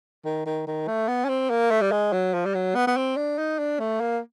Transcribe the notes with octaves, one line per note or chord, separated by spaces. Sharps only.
D#3
D#3
D#3
A3
B3
C#4
C4
A#3
A3
G3
G#3
F#3
F3
G3
F#3
B3
B3
C4
D4
D#4
D4
A3
A#3